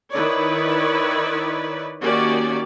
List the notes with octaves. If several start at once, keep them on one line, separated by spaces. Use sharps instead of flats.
D#3 E4 B4 C#5 D5
D#3 A#3 C#4 F#4 G4 D5